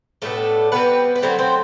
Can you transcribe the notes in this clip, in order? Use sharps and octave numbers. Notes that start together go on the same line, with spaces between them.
A2 G3 A3 B3 D4 A4
E3 G3 B3 C4 B4
B4
D3 F#3 A3 C4 C5
C4 C5